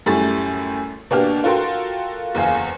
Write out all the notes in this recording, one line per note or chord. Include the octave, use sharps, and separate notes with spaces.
F#2 A2 G3 A3 G#4 A6
B2 A#3 D4 G4 F6
F4 F#4 A4 A#4 G5 C6
F#1 E2 G#4 F5